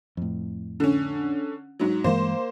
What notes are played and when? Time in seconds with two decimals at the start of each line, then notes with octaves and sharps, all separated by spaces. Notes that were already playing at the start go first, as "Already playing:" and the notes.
0.17 F2 A2
0.80 D3 C#4
1.79 G#2 F#3
2.04 G2 E3 G#3 A#3 C5